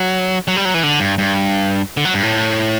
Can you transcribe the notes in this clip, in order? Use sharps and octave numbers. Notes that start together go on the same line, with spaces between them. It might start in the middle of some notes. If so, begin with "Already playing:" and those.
Already playing: F#3
F#3
G3
F#3
E3
D3
G2
G2
D3
F#3
G2
A2